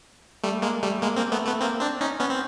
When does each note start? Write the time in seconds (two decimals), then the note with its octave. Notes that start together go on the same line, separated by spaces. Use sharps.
0.43 G3 A3
0.62 G#3 A#3
0.83 G3 A3
1.02 G#3 A#3
1.17 A#3 C4
1.32 A3 B3
1.46 A3 B3
1.61 A#3 C4
1.81 C4 D4
2.01 C#4 D#4
2.19 B3 C#4
2.30 C4